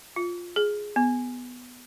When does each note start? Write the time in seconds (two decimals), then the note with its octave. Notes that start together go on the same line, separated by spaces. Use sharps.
0.16 F4
0.56 G#4
0.96 B3